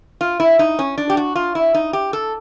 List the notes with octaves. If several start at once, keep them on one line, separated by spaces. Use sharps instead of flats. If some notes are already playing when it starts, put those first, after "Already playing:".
F4
E4
D#4
C#4
D4
G4
F#4
F4
E4
D#4
G4
A4